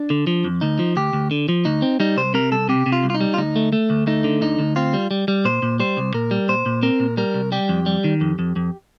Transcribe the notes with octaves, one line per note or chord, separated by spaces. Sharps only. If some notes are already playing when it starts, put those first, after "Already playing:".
Already playing: D4
D3
F3
F2
D2 D#4
F3
D2 G4
D2
D3
F3
D2 D#4
C4
G3 D#4
C2 C5
C3 A#4
C2 A4
C3 G4
C3
F4
C2
F4
D#4
G3
F4
D2 D#4
A3
A3
D2
A3 D#4
D3
D2 D#4
D2
C4 F4
G3
G3
G3
A#2 C5
A#2
G3 C5
C2
A#2 A#4
G3
A#2 C5
A#2
C4 A#4
A#2
G3 A#4
C2
G3 G4
F2
G3
D#3
F2
F2
F2